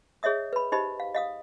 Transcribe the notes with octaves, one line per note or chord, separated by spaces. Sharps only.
G#4 C#5 D#5 E5 D#6
B4 B5
D#4 G4 C5 D#5 B5
F5
D#5 F5 D#6